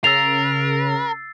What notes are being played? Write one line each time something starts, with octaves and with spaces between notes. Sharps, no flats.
C#3 A#4 E6 A6 C7 F7